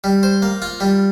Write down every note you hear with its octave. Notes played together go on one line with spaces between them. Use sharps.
G3
C5
A#3
F4
G3